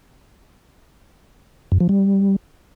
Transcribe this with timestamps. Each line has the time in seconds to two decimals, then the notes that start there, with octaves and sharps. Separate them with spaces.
1.72 F#2
1.80 F3
1.89 G3